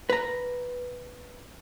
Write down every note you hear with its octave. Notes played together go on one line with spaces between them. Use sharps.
B4 A#5